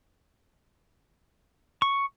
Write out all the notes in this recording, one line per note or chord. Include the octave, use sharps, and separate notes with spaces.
C#6